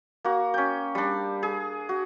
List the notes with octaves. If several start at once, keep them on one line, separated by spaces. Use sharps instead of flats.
A#3 F#4
C#4 G5
G3 D4
G#4
F#4